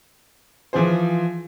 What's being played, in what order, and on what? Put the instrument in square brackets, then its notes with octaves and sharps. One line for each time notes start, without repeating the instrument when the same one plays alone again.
[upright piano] E3 F3 F4 G#4 C5